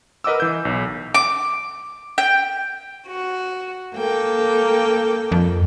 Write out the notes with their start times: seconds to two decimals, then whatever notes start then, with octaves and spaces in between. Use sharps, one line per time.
0.24 A#4 B4 D#5 F#5 D6 E6
0.40 E3 G6
0.65 B1
1.14 D6
2.18 G5
3.07 F#4
3.94 A#3 A4 G5
5.32 F2